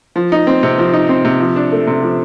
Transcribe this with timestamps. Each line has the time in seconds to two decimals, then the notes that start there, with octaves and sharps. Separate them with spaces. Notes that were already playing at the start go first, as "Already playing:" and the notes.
0.16 F3
0.32 D#4
0.47 C4
0.63 C3
0.78 F3
0.93 D#4
1.09 C4
1.25 C3
1.40 F3
1.56 D4
1.72 A3
1.87 C3
2.02 F3